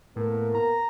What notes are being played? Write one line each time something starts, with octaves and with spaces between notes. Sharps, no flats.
A2 A#3 B3 A#4
A#5